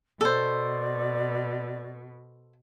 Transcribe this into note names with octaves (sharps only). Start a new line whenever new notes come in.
B2 A4 C5 D5